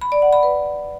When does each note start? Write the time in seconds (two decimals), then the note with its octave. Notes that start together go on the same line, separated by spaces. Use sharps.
0.01 B5
0.12 D5
0.22 F#5
0.33 B5
0.43 B4